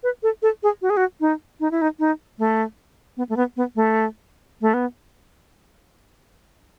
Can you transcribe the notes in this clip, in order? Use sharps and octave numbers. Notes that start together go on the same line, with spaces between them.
B4
A4
A4
G#4
F#4
G#4
F#4
D#4
D#4
E4
D#4
D#4
A3
B3
A3
B3
B3
A3
A3
B3